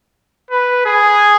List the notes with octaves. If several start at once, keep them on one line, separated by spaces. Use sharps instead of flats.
B4
G#4